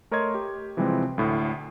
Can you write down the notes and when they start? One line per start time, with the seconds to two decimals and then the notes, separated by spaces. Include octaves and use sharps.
0.11 A3 A#4 C#5 D#5 C6 G#6
0.34 G4
0.77 C3 E3 F3 G3 G#3 C4
1.18 D2 A2